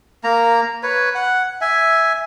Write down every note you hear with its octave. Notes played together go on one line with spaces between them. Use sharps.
A#3 A#5
B4 C#5
F#5
E5 G#5